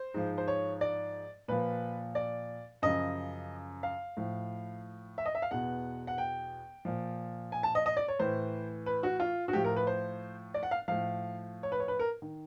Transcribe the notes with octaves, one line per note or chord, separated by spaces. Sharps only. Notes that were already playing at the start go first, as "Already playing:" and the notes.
Already playing: C5
G#2 F3
C5
C#5
D5
A#2 F3 B4
D5
F#2 C#3 F3 D#5
F5
A2 F3
E5
D#5
E5
F5
E2 B2 F#5
F#5
G5
A#2 F3
G#5
A5
D#5
D#5
D5
C#5
A2 E3 C5
B4
F#4
F4
F#4
A2 F3 G4
A#4
B4
C5
D5
F#5
F5
A2 F3 F5
C#5
B4
C#5
B4
A#4
D#3